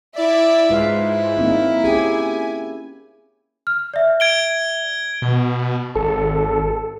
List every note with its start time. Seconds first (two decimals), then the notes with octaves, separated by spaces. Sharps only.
0.16 E4 D5 E5
0.70 G#2 F4 B4 F5
0.99 E4
1.37 A#3 C4 D#4
1.84 C#4 G4 G#4 G#5
3.67 F6
3.94 D5 E5
4.20 G#6 D7 G7
5.22 B2
5.96 G#1 A4